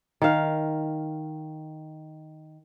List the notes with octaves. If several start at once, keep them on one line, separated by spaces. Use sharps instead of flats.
D#3 F5